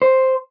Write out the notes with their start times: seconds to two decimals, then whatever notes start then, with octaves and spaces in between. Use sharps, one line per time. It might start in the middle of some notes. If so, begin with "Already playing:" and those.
0.02 C5